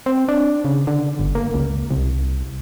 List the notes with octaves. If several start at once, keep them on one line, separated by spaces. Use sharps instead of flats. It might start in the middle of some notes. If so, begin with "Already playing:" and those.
C4
D4
C#3
D3
G1
A#3
C#2
C2